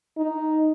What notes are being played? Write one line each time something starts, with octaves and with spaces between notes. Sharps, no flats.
D#4